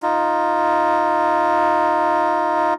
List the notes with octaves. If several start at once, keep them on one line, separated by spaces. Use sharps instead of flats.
D#4 F4